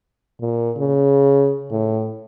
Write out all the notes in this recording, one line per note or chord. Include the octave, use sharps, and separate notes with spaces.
A#2
C#3
A2